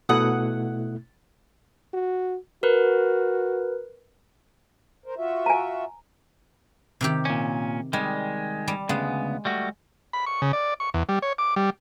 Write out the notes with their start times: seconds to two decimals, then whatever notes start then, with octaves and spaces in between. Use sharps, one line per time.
0.09 B2 A3 E4 F#5 D#6
1.93 F#4
2.63 F#4 A#4 B4
5.06 A#4 C5
5.18 F4 F#4 E5
5.46 G#5 A#5
7.01 C3 D#3 G4
7.25 A#2 C#4
7.93 D#3 G3 G#3
8.68 G3
8.89 D2 C#3 G#3 B3
9.45 G3 A3 F#4
10.13 B5
10.26 C#6
10.42 C#3
10.53 D5
10.80 C#6
10.94 E2
11.09 G3
11.22 C#5
11.38 D6
11.56 G3